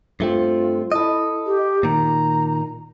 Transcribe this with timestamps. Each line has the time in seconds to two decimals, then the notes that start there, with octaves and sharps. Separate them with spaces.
0.20 G2 A3 C4 F4
0.92 E4 A4 D#5
1.46 G4
1.83 A#2 D#3 A#5